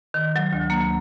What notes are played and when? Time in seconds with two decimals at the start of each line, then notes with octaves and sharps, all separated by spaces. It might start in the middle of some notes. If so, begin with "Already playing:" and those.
0.14 D#3
0.36 F#3
0.53 D2
0.70 A#3